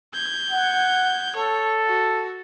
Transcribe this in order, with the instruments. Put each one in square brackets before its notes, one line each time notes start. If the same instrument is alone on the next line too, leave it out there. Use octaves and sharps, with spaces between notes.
[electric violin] G6 G#6
[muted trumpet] F#5
[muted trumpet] A4 [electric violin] C#5
[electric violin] F#4